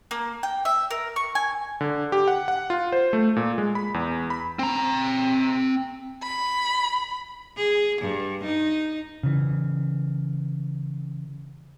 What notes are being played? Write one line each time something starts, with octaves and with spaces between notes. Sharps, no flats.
A#3
G5
E5
A#4
C#6
G#5
D3
G4
F#5
F#5
F4
C5
A3
A#2
G#3
B5
E2
B5
C4 A#5
B5
G#4
G2
D#4
C#3 E3